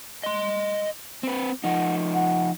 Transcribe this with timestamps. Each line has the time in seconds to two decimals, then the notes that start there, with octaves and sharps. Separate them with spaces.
0.23 D#5 C6
1.23 C4 B4
1.64 F3 D#4 F#5
2.14 F#5